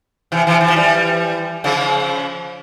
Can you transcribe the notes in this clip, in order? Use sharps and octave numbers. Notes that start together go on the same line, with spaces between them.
C3 E3
C3 E3
E3
F3
E3 G3
C#3 F3